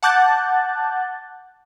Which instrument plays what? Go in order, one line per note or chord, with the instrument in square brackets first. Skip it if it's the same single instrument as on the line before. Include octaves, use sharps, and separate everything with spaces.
[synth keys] F#5 A5 D6 F#6 G6 A6